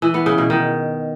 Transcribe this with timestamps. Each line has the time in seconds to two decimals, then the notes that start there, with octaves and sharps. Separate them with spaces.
0.02 E3
0.14 B3
0.26 C#3
0.38 B2
0.50 D#3